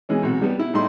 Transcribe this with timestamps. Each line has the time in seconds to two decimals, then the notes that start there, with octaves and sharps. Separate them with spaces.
0.09 B2 E3 G#3 C#4
0.23 B1 C3 F#4
0.42 G3 B3
0.59 E4
0.73 A2 G3 D#4 E4 C6